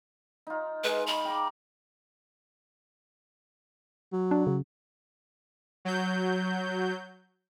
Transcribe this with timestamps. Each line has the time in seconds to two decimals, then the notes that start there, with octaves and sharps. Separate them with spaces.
0.47 D#4 F4
0.84 G#3 B4
1.07 B5
1.25 G5 A#5 D6
4.13 F#3
4.31 D4
4.47 C#3
5.85 F#3 G6